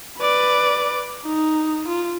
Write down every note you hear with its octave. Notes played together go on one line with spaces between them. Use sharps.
B4 D5
D#4
F4